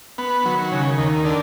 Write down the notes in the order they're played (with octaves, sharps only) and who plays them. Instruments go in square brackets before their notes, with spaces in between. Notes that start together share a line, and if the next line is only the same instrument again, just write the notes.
[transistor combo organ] B3
[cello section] D#3 [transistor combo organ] F#3
[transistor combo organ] C#3
D#2
D3